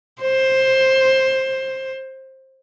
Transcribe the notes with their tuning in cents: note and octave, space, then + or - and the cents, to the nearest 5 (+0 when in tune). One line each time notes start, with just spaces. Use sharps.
C5 +15